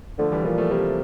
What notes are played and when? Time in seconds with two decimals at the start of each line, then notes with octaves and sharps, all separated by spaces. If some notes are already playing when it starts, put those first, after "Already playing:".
0.18 D3 F3 A3
0.32 E3 G3
0.45 A#2 F3
0.58 F3 A3
0.71 C3 G3 A#3